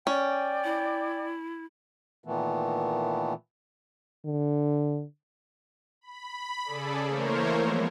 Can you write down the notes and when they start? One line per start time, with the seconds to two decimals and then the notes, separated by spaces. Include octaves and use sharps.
0.07 C#4 D5 G5
0.64 E4
2.24 A#2 D#3 E3 A3 B3
4.25 D3
6.01 B5
6.64 C#3 G#4 A4 D5
7.05 E3 A3 A#3 A#4 C5 C#5
7.56 F3 G#3 B3 E4